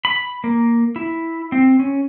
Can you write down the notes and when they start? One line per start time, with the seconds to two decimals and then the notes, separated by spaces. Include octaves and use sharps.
0.05 B5
0.44 A#3
0.96 E4
1.52 C4
1.79 C#4